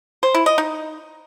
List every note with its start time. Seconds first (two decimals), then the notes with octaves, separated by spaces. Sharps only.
0.23 C5
0.34 E4
0.46 D#5
0.58 D#4